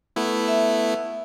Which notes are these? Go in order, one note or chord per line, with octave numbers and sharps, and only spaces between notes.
A3 B3 E4
E5